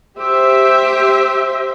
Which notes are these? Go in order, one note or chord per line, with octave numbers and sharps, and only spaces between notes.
G4 C5 E5